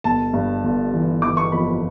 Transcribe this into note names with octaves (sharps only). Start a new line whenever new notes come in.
G1 A5
G2
G1
E3
E3 D6
C#6
F2 B5
B5